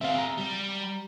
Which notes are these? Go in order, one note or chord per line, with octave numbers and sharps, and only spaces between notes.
C4 G#4 E5 F5
A#5
G3